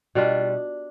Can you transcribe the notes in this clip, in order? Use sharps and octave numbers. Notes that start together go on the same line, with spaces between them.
B2 G3 D4 F4